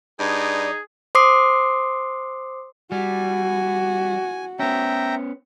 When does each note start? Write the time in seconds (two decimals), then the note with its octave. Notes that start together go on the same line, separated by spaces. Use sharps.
0.20 G2 D#4 G#4 D5
1.15 C5 C6 D6 D#6 C7
2.92 G3 F#4 G#5
4.59 B3 C#4 E5 G5 A#5